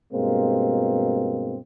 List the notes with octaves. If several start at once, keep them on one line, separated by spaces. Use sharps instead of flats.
G2 B2 G#3 A#3 C4